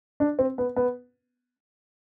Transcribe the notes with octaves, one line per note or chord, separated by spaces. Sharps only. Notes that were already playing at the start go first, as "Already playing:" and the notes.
D4
C4
B3
B3